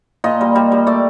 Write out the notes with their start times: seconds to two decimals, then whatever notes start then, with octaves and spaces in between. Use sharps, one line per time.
0.24 A#2 D#5
0.41 G3
0.55 G3
0.72 G3
0.87 A3 D5